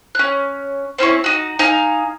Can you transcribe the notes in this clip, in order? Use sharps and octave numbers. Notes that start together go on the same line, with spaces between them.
C#4 F#6
C4 C#4 E4 C#6
D#4 F#4
D#4 F5 G#5